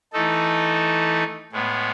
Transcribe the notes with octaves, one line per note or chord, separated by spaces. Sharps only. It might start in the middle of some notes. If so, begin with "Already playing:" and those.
E3 A3 D#4 A4
A2 G#3 B3